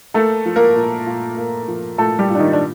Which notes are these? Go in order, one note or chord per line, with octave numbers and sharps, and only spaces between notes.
A3 A#3 A4
F3
A#3 A#4
A#2
A#2
A#3
F3
A#2 A3 A4
G3 G4
A#2
D4
D#3 D#4
D4